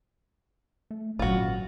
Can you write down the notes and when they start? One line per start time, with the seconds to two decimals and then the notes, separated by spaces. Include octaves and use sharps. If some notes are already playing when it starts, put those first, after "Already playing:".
0.91 A3
1.19 G#1 A#2 F#3 C#4 F4 F#4